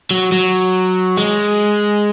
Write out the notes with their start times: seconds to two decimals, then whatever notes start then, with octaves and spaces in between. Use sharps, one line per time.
0.11 F#3
0.32 F#3
1.17 G#3